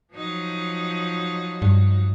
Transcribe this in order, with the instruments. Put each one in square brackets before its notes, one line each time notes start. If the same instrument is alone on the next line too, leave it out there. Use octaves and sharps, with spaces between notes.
[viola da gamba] F3 F#3 D#4
[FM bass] G2